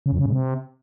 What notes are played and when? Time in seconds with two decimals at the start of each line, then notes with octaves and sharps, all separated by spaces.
0.06 C#3
0.12 F2
0.19 C#3
0.26 G#2
0.32 C3